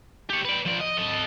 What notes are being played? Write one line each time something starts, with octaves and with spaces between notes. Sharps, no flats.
G4 C#5
B4 D5
F3 D5
D#5
A4 D#5